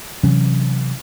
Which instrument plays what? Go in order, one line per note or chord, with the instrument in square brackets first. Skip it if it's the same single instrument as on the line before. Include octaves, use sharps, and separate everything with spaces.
[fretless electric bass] C3 E3 F#3 C#4